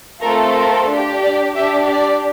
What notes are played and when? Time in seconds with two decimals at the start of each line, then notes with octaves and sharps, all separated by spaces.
0.22 A3 C4 F4 A4 A#4
0.56 A#4
0.89 D4 G4
1.24 D5
1.56 D4 G4 E5
1.90 D5